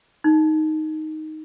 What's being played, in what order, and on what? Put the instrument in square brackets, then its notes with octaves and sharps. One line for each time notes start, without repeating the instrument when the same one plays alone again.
[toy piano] D#4